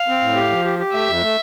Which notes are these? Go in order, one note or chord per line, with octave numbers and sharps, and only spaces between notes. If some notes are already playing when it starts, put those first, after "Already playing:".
Already playing: F5
C4
A2
G4
F3
G4
G4
A3 E5
F2
A3